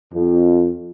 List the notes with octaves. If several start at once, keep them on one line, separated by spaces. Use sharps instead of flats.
F2